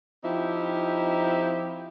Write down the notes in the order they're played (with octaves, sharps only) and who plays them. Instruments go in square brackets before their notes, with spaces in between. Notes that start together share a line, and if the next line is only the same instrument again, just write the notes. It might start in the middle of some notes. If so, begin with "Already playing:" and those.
[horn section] F3 C4 D#4 E4 G4